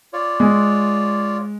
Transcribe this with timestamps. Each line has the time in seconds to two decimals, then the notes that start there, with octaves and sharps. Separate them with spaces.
0.13 F4 C#5 D5
0.40 G#3